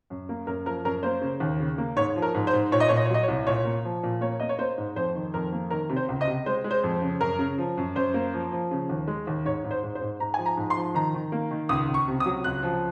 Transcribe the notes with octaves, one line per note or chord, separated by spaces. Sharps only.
F#2
A#3
F#2 A#4
F3 A#4
F#2 A#4
A#3 C5
C#3
D#2
C#3
A#3
G#2 C#5
F3
A#4
G#2
C5
G#2
A#2 C#5
D#5
A#2 C#5
D#5
C#5
F#3 D#5
C#5
C2
A#2 C#5
A#3
F3
A#2
A#3 C#5
A#3 D#5
C#5
A#3 C5
G#2
F2 C5
D#3
F2 A#4
A#3
D#3 A#4
C3
C5
C#2
D#5
C3
G#3 C5
G#3
C5
F2
C#3
F#2 A#4
C#3
F3
F#2
F#2 C5
A#3
F3
F3
C#3
D#2
G#3
D#2
G#2 C#5
G#2
C5
G#2
C5
G#2
G#2 A#5
F3 G#5
A#5
G#2
C6
F3
D#3 A#5
D#3
A#3
D#3
C#2 D#6
C#2
C#6
C3
D#6
F#3
C#2 F#6
F3